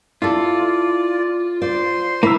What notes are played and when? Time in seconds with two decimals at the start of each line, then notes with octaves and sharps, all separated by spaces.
0.22 E4 F4 A4 D5
1.62 C5 D5 C6
2.23 A#3 E4 E6